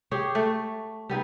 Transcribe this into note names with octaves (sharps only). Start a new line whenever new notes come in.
G4 G#4 C#5
A3
G3 B3 D#4 G#4